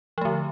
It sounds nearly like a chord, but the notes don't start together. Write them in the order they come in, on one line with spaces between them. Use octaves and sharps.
F3 A3 D3